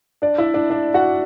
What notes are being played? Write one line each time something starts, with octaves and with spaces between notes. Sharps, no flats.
D4 D5
E4 E5
D4 D5
D4 D5
F#4 F#5